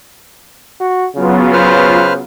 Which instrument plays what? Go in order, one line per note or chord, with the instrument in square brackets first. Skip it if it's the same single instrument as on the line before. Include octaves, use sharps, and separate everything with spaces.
[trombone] F#4
[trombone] C#3 [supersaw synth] F#3 B3 F4
[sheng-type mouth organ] B4 C5 F6